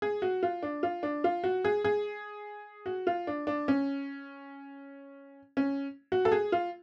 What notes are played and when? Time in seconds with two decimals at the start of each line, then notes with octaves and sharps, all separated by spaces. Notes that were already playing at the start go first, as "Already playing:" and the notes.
0.02 G#4
0.22 F#4
0.43 F4
0.63 D4
0.83 F4
1.03 D4
1.24 F4
1.44 F#4
1.65 G#4
1.84 G#4
2.86 F#4
3.07 F4
3.27 D4
3.47 D4
3.68 C#4
5.57 C#4
6.12 F#4
6.25 A4
6.32 G#4
6.52 F4